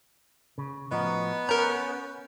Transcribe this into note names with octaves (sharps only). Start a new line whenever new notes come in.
C#3
A2 F3 B3 F#4 D#5 A#5
C#4 A#4 A#5 G6